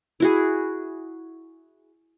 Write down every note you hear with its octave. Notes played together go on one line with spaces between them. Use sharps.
E4 F#4 G#4